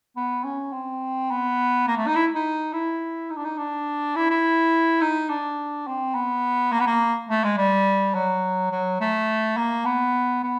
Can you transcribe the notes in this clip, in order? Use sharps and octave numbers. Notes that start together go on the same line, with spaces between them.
B3
C#4
C4
B3
A#3
A3
D#4
E4
D#4
E4
D#4
D4
D#4
D4
E4
E4
D#4
D4
C4
B3
A#3
B3
A#3
A3
G#3
G3
F#3
F#3
A3
A#3
B3
B3